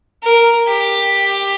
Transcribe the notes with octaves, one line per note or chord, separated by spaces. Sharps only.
A#4
G4